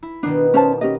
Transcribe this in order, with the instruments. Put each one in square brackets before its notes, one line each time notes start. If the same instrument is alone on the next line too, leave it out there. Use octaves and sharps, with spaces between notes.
[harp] E4
[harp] B2 D#3 B3 [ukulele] D4
[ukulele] C#4 C5 A5
C#4 G4 D#5